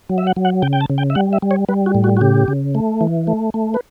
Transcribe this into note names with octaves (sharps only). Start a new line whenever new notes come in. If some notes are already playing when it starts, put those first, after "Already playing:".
F#3
E5
F#5
F#3
F#5
C#3 G5
G5
A5
C#3
G5
E5
G3 F#5
E5
G3
C#5
G3 B4
F#4
A2
F#4
F#4
C#3 G4
C#3
A3
E3
A3
A3
B4